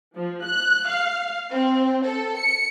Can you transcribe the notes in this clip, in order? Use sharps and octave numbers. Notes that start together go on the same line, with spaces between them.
F3
F#6
F5
C4
A4
C#7